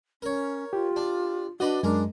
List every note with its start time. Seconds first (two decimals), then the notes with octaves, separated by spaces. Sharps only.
0.22 C#4 A#4 C#5
0.73 F4 G4
0.96 D4
1.60 D4 F#4 B4 D5 D#5
1.83 F#2 G#3 D4 A#4